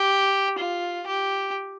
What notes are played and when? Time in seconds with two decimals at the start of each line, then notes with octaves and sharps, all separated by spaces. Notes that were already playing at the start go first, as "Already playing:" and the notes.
Already playing: G4
0.59 F4
1.08 G4